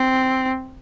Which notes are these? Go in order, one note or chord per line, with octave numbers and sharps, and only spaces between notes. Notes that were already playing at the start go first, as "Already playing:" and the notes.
Already playing: C4